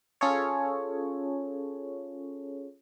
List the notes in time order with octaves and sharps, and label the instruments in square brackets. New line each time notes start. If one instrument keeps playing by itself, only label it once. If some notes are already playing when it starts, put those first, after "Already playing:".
[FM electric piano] C#4 F4 G#4 A4 C#5